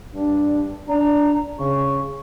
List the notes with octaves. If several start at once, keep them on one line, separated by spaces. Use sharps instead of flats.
G2 D4
D4 A#5
C#3 C#6